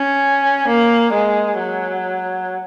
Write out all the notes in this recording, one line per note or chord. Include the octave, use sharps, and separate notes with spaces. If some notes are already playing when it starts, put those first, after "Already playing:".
Already playing: C#4
A#3
G#3
F#3